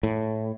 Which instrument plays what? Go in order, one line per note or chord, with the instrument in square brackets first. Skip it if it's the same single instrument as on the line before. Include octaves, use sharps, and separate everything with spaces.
[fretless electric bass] A2